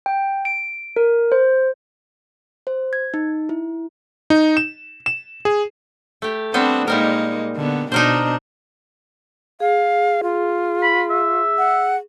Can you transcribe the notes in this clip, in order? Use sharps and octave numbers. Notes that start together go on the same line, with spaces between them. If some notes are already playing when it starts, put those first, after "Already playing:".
G5
D7
A#4
C5
C5
G#6
D#4
E4
D#4
E7
E7
G#4
A3 G4
G3 B3 C4 D4 C5
A#2 G3 G#3 A#3 D#4 A#4
D3 B3
B2 D4 D#4 A#4 C5
G#4 F5
F4
B5
E5
F#5